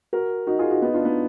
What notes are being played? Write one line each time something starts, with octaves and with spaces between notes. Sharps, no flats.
F#4 A#4
D#4 F#4
F4 G#4
D#4 F#4
B3 D#4
D4 F4
B3 D#4